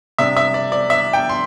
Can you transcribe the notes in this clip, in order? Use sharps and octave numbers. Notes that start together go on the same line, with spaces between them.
C3 G3 D4 E5
E5
D5
D5
E5
G5
C6